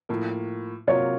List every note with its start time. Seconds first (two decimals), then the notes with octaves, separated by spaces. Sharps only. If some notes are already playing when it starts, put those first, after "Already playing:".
0.09 A2 F3 A#3
0.87 C3 F#3 A#3 F4 A#4 C#5